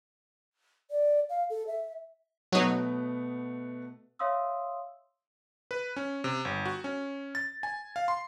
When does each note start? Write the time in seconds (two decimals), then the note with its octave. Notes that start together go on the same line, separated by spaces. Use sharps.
0.91 D5
1.29 F5
1.50 A4
1.67 E5
2.52 B2 F#3 A3 B3 D#4
4.19 C#5 E5 F5 C6 D#6 E6
5.71 B4
5.96 C#4
6.24 C3
6.45 G1
6.65 F#4
6.84 C#4
7.35 A6
7.63 G#5
7.96 F5
8.08 C6